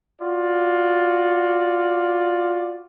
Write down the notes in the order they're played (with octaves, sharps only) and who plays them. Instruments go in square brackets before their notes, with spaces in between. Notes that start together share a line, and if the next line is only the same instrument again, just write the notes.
[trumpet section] F4 F#4 D5